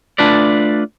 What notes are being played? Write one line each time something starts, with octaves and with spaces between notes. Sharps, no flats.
A3 D4 F4 B4 D5